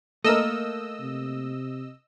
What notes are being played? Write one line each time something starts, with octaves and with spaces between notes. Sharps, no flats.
A3 A#3 A4 A#4 D#5 E6
C3